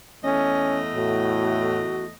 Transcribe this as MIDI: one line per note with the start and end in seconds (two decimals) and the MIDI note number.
0.24 2.12 40
0.24 2.12 57
0.24 0.81 61
0.24 2.12 75
0.95 1.83 45
0.95 2.05 66